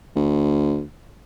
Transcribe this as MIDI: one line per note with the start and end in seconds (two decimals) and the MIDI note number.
0.16 0.83 38